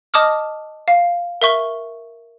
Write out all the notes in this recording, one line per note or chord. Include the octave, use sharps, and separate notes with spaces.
D#5 A5 D6 D#6 F6
F5
A#4 E5 C#6 G7